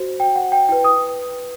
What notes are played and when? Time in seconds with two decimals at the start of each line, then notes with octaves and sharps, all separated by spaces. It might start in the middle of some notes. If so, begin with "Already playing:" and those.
Already playing: F#4 C5
0.20 G5
0.36 F#5
0.52 G5
0.69 E4 B4 G5
0.84 D#6